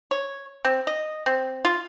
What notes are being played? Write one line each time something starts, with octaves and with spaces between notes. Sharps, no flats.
C#5
C4
D#5
C4
F4